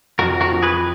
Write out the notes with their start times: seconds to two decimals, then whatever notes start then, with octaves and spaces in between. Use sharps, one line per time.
0.19 F2 F#4 A#4
0.41 F#4 A#4
0.52 F3
0.63 G#4 B4